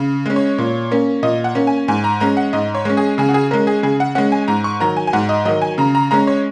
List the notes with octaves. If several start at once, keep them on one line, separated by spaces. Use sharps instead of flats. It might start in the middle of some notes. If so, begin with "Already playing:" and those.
Already playing: C#3
G#3 C#4
C#5
A#2
A#3 C#4
A#2 D#5
F#5
A#3 C#4
G#5
G#2 G#5
A#5
G#3 C#4 A#5
F#5
G#2 D#5
C#5
G#3 C#4
G#4
C#3 G#4
F#4
G#4
G#3 C#4 A#4
G#4
C#3 G#4
F#5
G#3 C#4 F#5
G#5
G#2 A#5
C#6
D#3 F#3 A#5
G#5
G#5
G#2 F#5
D#5
D#3 F#3 D#5
G#5
C#3 A#5
A#5
G#3 C#4 A#5
C#5